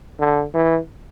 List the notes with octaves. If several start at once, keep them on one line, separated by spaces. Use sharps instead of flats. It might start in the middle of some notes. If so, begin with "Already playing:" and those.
D3
E3